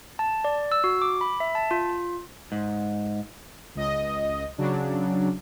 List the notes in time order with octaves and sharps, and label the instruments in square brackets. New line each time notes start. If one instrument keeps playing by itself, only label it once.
[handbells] A5
D5
E6
F#4
D6
B5
E5
A5
F4
[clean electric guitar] G#2
[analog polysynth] C#2 D#5
C#3 F#3 D4